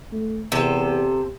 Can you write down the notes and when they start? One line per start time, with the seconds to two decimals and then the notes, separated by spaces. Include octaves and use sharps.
0.12 A3
0.52 E2 C3 A4